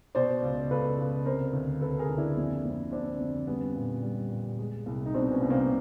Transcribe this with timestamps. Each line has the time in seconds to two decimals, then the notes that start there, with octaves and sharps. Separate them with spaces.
0.15 B2 C5 D5
0.42 C#2
0.70 C#2 A4 B4
0.99 C#2
1.25 C3 A#4 C5
1.53 D2
1.81 C3 A4 B4
1.99 G#4 A#4
2.09 D2
2.18 D4 E4
2.37 F2
2.65 F2
2.92 F2 C4 D4
3.20 F2
3.47 G3 B3 C#4
3.75 A#2
4.03 G3
4.31 A#2
4.59 G#3
4.86 C2
5.06 D#4
5.14 B2 C4 D4
5.32 B3 C#4
5.42 C2
5.50 A#3 C4